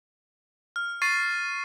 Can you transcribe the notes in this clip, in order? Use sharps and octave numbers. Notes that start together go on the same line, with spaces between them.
F6
C#6 A6 C7 D#7